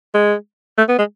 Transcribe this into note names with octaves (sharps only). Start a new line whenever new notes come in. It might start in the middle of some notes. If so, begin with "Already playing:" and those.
G#3
A3
B3
G#3